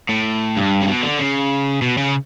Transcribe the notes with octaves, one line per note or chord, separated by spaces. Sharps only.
A2
G2
C#3
B2
D3
C#3
B2
C#3